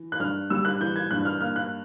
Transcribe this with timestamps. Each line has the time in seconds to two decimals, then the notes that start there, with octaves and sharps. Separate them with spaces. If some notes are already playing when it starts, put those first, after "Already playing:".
Already playing: E3
0.12 F#6
0.20 G2 F6
0.50 G3 E6
0.65 F#6
0.80 E3 G6
0.96 G#6
1.11 G2 F#6
1.25 F6
1.40 A#3 F6
1.56 F#6